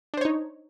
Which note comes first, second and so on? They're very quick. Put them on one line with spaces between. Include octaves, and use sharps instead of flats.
D4 C5 C#5 D#4